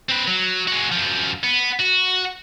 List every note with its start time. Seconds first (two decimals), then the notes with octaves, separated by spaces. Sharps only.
0.09 C4 B4
0.27 F#3
0.68 G#3 F#4
0.92 F#2 F3
1.43 B3
1.79 F#4